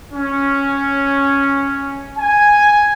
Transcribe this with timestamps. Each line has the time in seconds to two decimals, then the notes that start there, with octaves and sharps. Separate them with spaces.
0.14 C#4
2.18 G#5